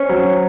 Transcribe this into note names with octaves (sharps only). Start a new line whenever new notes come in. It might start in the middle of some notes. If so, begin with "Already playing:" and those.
Already playing: C#4 C5 C#5
F#3